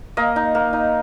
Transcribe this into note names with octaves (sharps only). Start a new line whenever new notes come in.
A#3 D#5
D#4
A#3
D#4